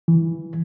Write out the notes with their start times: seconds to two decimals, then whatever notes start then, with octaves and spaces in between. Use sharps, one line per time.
0.08 E3